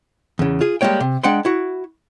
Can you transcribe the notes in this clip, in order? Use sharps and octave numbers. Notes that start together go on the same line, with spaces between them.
E2 C#3
F4 G#4
G3 G#3 A#3 C#5 G5
C3
G#3 D4 F#5 G5 C6
E4 F#4